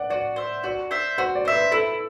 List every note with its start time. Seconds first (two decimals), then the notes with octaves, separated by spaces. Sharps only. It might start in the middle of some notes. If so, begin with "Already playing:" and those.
Already playing: D5 F#5
0.10 F#4 D5
0.36 C5 E5
0.64 F#4 D5
0.91 C5 E5
1.18 F#4 C5
1.35 D5
1.45 C5 E5
1.53 B4
1.71 E4 A4